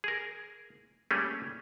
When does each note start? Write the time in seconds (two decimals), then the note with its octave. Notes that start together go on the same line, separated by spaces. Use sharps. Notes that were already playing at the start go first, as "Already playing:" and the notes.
0.04 G#4 A#4
1.11 G3 A3 A#3 C#4 G4 G#4